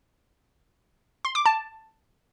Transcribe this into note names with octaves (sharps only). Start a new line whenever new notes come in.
C6
D6
A5